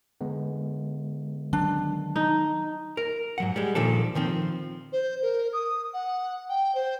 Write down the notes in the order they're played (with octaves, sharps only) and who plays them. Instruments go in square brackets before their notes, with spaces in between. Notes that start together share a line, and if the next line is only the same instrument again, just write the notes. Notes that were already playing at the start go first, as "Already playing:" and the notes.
[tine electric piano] D3 G#3 B3
[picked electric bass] D#3 F#3 [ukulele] D4
[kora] D#4
[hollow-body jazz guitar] A#4
G#2 F#3 F#5
G3 G#3
A#2 D#3 F3 D4 A4
D#3 F3 C4
[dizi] C5
A#4
D#6
F#5
G5
C5